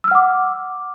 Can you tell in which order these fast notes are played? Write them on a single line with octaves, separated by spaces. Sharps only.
E6 F6 F#5 D6